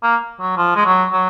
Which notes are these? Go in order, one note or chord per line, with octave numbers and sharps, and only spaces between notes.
A#3
F#3
F3
G#3
F#3
F#3